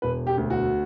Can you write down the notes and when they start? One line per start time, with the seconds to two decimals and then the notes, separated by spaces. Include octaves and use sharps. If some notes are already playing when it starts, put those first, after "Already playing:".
0.02 E1 B4
0.27 G4
0.37 D2
0.50 F#4